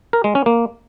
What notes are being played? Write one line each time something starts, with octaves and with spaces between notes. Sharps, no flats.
A#4
G#3
C#4
A#3